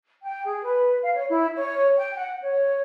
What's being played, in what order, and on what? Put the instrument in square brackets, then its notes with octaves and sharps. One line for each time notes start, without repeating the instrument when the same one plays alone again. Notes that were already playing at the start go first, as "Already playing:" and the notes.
[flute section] G5
G#4
B4
F5
C#5
E4
C#5
G5
F#5
C#5